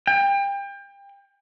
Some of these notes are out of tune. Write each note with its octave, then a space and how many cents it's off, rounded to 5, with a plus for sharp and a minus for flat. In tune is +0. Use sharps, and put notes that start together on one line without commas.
G5 +30